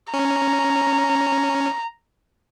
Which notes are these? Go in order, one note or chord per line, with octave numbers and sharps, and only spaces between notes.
C#4 A#5